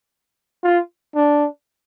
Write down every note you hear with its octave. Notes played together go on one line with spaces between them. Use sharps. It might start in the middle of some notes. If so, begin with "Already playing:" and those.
F4
D4